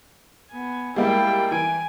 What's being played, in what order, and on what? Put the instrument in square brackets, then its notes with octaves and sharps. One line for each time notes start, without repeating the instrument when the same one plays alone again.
[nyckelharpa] B3 G#5
[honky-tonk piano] G3 G#3 A#3 [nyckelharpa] E4 G5
[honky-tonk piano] E3 D7 [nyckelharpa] G#5